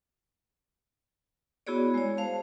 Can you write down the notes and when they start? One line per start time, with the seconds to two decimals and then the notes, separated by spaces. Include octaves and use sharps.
1.67 B3 E4 F#4 G#4 C#5 D5
1.94 G#3 C#5
2.17 C5 F5 A5